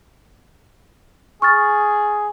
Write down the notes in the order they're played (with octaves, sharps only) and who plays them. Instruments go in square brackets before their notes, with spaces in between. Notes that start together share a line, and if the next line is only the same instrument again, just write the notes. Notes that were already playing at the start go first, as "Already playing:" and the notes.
[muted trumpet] G#4 [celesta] C#6 F6 A6